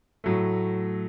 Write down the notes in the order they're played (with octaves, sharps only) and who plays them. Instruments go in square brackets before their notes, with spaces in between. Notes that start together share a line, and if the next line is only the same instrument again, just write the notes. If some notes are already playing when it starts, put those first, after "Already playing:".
[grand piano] A2 F#3 A3